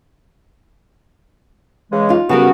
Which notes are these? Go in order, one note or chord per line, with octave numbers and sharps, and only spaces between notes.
C#3 E3 G#3
D#4 F4
C#3 G3 B3 F#4 A#4